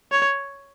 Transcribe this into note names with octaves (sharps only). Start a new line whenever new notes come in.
C#5